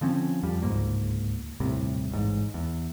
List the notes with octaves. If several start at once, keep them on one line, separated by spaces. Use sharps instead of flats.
D3 F3 C4 C#4
F2 F3 G3
D1 C#2 G#2 A#3
D#1 C2 A2 C3
A1 G#2
E2